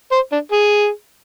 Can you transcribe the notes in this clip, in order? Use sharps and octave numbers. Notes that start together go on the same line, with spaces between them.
C5
D4
G#4